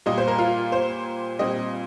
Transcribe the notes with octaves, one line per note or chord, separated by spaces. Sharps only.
A#2 G3 A#3 D#5
C5
A#4
F4
C5
A#2 G3 C4 D#5